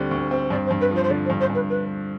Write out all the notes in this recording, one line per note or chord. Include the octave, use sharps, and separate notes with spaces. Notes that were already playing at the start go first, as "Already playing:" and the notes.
Already playing: D2 D3 G3 C4
D2
C4
G2 D5
C5
G2
B4
F3 C5
C5
D3 D5
C5
G2
C5
G2 B4
B4